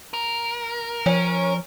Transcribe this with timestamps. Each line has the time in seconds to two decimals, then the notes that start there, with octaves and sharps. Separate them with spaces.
0.13 A#4
1.06 F3 C#4